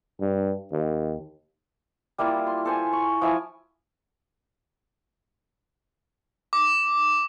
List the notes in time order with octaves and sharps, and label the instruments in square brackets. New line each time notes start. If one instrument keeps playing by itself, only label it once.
[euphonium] G2
D#2
[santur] G3 A#3 E4 F4
C6
A4 C5 G#5
C#6
F3 E4 G#5 D6
[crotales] D6